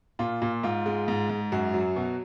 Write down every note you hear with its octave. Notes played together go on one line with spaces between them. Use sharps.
A#2 F4
A#2
G#2 F4
G#3
G#2
G#2
F#2 F#4
F#3
B2